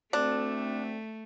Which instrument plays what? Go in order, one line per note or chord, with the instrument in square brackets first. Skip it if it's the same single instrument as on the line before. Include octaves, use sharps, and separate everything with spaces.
[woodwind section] D2 C4 [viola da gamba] A3 [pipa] D4